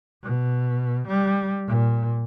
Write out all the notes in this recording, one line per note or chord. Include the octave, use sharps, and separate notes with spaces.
B2
G3
A#2